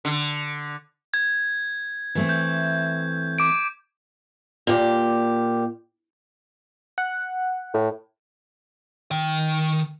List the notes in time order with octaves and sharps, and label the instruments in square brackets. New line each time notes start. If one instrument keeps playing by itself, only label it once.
[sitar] D3
[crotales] G#6
[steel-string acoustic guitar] E3 A3 C4
[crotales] G6
D6 D7
[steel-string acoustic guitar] A#2 G4
[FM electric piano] F#5
[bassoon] A2
[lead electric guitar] D#3 G5